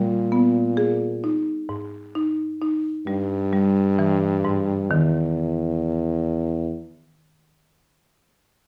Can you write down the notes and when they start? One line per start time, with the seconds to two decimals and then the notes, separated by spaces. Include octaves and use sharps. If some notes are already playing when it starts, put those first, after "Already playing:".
Already playing: A#2 G3
0.32 B3
0.77 G#4
1.24 D#4
1.69 G#2
2.15 D#4
2.62 D#4
3.07 G2 G3
3.53 G3
3.99 E3
4.45 G#2
4.91 E2 D#3